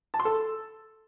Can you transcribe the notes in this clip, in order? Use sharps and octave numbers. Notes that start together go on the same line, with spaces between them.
A5
C6
A4